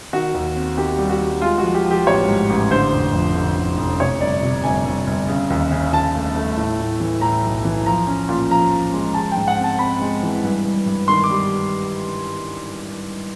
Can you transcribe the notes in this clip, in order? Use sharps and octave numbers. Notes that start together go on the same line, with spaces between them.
D#3 F#4
D#2
C4
D#3 G4
G3
F#4
G3
G#3 F4
F3 F#4
G4
F3
G4
A1 C#5
G#2
A1
D3 C5
F1
F2
D3
D3
F1
C3 C#5
G1 D5
C3
G1 G#5
G1
G1
C#3
D#2
C#3
D#2 A5
A3
A3
A2
A2
E3
A2 A#5
B1
E3
F3 A#5
C#4
A#2
F3 A#5
F3
G#3
G#3 A5
G#2 G5
F#5
C4
A5
C4 B5
G#3
E3
G2
G2
G2
D#3 C6
D6
G3